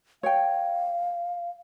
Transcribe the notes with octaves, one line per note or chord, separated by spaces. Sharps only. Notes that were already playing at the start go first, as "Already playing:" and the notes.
C#5 F5 G5